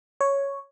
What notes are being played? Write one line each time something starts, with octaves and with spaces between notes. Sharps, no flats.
C#5